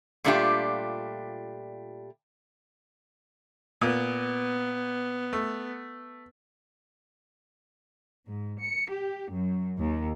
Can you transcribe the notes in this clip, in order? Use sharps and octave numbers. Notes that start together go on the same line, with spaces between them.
A#2 G3 A3 D4 F4 G4
A#2 B3
A3
G#2
C#7
G4
F#2
D#2